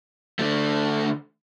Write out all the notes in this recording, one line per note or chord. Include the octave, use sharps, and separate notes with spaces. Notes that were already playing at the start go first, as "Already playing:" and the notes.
D3 A3